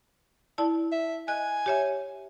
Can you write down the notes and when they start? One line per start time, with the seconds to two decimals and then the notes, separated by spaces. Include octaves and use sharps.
0.58 E4 D5 A5
0.92 E5
1.28 D#5 G#5 F#6
1.66 G4 C#5 E5